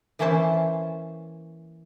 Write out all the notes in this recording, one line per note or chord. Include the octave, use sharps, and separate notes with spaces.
E3 A#3 C#4 E4 C5 A5